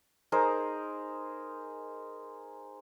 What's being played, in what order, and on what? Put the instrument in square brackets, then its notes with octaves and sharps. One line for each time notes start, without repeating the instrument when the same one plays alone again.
[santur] D#4 G#4 A#4 C5